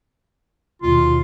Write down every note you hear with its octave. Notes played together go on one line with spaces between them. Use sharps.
D#2 B2 F4